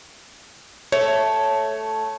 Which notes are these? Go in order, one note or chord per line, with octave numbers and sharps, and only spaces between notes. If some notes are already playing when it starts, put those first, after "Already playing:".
A3 C#5